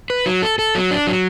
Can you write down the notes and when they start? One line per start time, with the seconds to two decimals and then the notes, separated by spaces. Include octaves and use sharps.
0.10 B4
0.26 F#3
0.42 A4
0.59 A4
0.75 F#3
0.91 D4
1.07 F#3